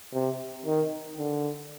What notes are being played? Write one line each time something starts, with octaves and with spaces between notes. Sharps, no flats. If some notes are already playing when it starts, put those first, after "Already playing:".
C3
D#3
D3